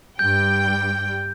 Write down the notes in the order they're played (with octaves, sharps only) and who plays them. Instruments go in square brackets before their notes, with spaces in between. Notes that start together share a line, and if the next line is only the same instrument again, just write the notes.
[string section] G2 G3 G5 [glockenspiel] G6